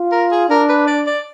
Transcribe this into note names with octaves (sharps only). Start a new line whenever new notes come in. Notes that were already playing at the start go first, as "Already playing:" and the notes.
Already playing: F4
A#4
G#4
D4 A#4
B4
D5
D5